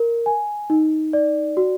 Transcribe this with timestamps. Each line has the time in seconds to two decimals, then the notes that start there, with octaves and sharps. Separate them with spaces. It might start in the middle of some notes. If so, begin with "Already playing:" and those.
Already playing: A#4
0.26 G#5
0.70 D#4
1.13 D5
1.57 F#4